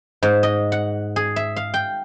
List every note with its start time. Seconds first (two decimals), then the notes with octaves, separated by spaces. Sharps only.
0.23 G#2
0.43 D#5
0.72 F#5
1.16 G#4
1.36 E5
1.56 F5
1.74 G5